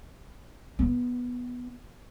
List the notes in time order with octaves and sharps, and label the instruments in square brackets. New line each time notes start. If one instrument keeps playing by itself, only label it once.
[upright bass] B3